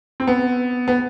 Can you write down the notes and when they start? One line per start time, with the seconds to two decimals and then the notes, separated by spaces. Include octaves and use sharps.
0.20 C4
0.27 B3
0.88 B3